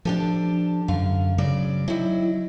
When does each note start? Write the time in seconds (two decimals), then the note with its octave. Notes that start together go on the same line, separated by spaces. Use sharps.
0.05 F3 D4 G4 A4
0.88 F#2 D3 F5
1.38 C#3 F#3 D5
1.88 D#3 F#3 E4